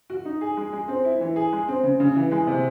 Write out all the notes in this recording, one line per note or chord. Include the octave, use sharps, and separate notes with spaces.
F#4
D#4
G#4
G#3
G#3
C4
E4
E3
G#4
G#3
C4
C#3
C#3
E3
G#3
C3